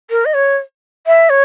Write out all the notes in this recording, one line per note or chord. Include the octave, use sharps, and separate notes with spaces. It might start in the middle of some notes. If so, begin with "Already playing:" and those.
A#4
D#5
C#5
E5
C#5